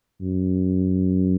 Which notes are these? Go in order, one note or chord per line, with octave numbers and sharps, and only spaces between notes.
F#2